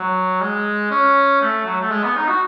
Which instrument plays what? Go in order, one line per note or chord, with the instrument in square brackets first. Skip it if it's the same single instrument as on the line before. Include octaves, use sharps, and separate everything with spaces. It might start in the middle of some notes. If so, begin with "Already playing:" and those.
Already playing: [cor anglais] F#3
G#3
C#4
A3
F#3
A3
G#3
B3
D#4
F#4